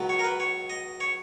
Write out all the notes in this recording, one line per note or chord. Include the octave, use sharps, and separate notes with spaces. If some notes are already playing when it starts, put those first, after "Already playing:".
Already playing: C#2 B2 F#3 B3
C#5
A#4
B4
C#5
D#5
C#5